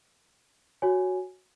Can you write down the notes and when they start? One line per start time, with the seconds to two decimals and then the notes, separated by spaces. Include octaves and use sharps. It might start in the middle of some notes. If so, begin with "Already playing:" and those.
0.82 F#4 C#5 G#5